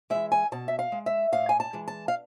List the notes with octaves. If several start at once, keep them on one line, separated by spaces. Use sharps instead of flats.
E3 G#3 E5
G#5
B2 A5
E5
F5
G#3
E5
A2 F5
G#5
A5
E3 G#3
A5
F5